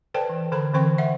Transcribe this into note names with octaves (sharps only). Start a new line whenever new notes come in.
A4 B4 C5 D5 G5 A5
E3
D3 A4 C5 A#5 B5
D3 E3 C4 C5 G5 C#6
C5 E5 F#5